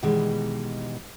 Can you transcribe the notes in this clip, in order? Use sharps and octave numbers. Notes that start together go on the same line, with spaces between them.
B2 D#3 E3 G3 G#3